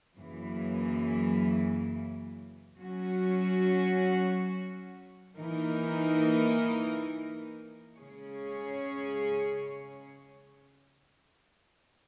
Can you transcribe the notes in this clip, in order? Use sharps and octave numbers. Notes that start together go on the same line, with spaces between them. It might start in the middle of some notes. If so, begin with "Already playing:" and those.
F#2 C#3 E3 A#3
F#3 C#4 F#4
E3 A#3 D#4 A#4
C#3 G#3 C#4 G#4 C#5